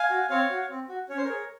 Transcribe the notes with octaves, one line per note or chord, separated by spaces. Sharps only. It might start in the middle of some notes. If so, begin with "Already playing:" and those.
Already playing: F5 G#5
F#4
C4 C#5 F5
F#4
C4
F#4
C#4 C#5
C5
G#4 A#4 C#5